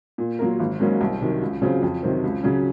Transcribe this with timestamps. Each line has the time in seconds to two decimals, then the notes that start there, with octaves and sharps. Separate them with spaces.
0.18 A#2
0.39 F#3 A#3 F4 A#4
0.60 G#1
0.80 G#2 F#3 A#3 C#4
1.01 C2
1.21 C3 D#3 F#3
1.42 C#2
1.62 C#3 F#3 C4 F4
1.82 F2
2.03 C3 D#3 F#3 C4
2.24 C#2
2.43 C#3 F#3 C#4